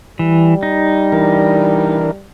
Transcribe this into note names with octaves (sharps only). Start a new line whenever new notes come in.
E3 G3
D#4
E3 D4 A#4